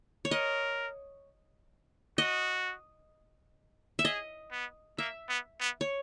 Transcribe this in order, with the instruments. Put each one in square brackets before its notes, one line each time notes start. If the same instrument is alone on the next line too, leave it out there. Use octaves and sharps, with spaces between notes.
[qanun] C#5
[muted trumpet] A#4 [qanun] D#5
[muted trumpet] F#4 [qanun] D#5
[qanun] E5
[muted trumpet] G#4 [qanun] D#5
[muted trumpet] B3
[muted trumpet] A#3 [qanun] E5
[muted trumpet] B3
B3
[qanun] C#5